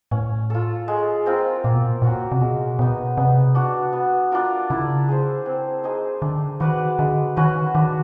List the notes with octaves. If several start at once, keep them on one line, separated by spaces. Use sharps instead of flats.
A2 C#4
F4 A4
G#3
C4 F4 A#4
A#2 A#3
B2
A#2
A#2 C#4 F#4 A#4
C3
B2 G#3
B2 B3 D#4
C3 B3
D4 F#4
B3
D4 F4 A#4
C#3 E4
G#4 C5
C4
D#4 G#4 C5
D3 D4
D#3 F#4 B4 D5
D3 G#3
D#3 C#4 F#4 B4
D#3 D4